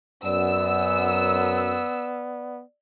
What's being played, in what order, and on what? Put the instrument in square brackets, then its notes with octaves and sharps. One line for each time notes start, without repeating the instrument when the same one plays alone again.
[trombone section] F#2 [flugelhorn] B3 [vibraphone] D5 [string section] E6